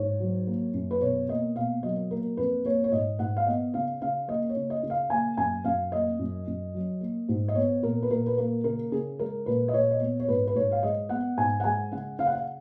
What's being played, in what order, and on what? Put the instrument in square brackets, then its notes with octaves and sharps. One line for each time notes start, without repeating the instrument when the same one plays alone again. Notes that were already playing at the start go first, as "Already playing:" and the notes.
Already playing: [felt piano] G#2 C#5
F#3
A#3
F#2
B4
B2 C#5
A#3 D#5
B2 F5
F#3 D#5
A#3 A#4
F2 B4
A#3 C#5
C#5
G#2 D#5
G#2 F#5
F5
B3 D#5
C#3 F5
C#3 F5
A#3 D#5
C#5
C#3
D#5
C#3
F5
A#3 G#5
F#2 G#5
F#2 F5
A#3 D#5
F#2
F#2
F#3
A#3
G#2
D#5
B3 C#5
A#2 A#4
B4
A#2 A#4
B4
A#3 A#4
C#3 A#4
C#3 G#4
G#3 A#4
A#2 B4
D#5
A#2 C#5
D#5
B3 C#5
C#5
G#2 B4
B4
G#2 C#5
F5
G#3 D#5
B3 F#5
G#2 G#5
F#5
G#3 G#5
C#3 F#5
C#3 F5
F#5
F5